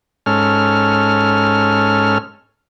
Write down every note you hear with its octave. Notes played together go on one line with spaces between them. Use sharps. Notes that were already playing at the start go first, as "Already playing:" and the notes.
G#2 C#4 A4 F6